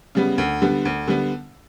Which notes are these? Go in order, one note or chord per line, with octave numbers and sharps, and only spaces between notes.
C#3 G3 B3
D2
D3 G3 B3
D2
D3 G3 B3